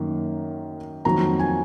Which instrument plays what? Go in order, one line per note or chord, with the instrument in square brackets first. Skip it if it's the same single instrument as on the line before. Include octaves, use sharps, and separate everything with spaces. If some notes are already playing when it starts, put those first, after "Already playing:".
Already playing: [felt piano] F#2 D#3 A#3
F2 D#3 F#3 A#3 A#5
G#5